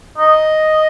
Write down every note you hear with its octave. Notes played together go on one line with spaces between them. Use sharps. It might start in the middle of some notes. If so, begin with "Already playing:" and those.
D#5